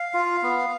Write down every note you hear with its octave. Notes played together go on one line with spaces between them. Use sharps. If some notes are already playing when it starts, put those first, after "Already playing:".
Already playing: F5
F4
B3